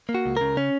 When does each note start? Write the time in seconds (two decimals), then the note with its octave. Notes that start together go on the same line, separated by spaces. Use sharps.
0.09 A#3
0.15 F#4
0.26 C#2
0.37 C#3 A#4
0.57 C#4